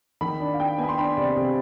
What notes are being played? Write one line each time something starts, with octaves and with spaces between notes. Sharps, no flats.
D#3 B5
D4
F5
D4 G5
B3 G#5
B5
C6
D4 B5
C3 D5
C3